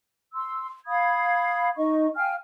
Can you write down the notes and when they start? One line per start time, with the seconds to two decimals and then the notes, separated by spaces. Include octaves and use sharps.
0.34 C6 E6
0.87 F5 B5 D#6 G#6
1.77 D#4 D#5 C#6
2.16 F5 G5 G#5 F6